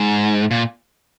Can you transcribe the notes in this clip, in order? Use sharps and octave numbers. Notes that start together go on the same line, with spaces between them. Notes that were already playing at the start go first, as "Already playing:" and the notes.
Already playing: G#2
A#2